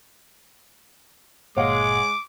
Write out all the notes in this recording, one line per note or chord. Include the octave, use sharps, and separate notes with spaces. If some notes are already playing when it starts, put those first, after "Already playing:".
G1 A#2 G#3 C#5 F5 F#5 D6